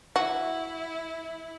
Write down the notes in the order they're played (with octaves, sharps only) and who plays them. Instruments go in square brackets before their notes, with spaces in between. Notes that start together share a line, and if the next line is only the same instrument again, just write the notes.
[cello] E4 [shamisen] F#4